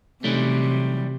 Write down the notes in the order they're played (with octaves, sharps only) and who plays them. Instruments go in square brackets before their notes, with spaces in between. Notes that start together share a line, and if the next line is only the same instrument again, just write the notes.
[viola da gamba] C3 [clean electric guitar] E3 F#3 G3 [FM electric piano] A3 C#4 D#4